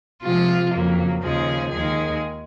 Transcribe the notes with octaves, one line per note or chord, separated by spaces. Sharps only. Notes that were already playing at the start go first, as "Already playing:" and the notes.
C3 F3 G#3 F4
F2 C#3 F#3 A#3
D#2 C#3 F3 G#3 G#4
D#2 D#3 G#3 G#4